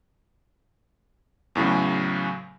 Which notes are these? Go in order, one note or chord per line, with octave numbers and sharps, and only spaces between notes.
E2 A2 C#3 F#3